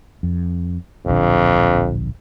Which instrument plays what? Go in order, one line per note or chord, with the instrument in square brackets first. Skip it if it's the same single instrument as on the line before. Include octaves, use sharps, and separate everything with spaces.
[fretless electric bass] F2
[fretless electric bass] D1 A#1 D3 [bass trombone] F2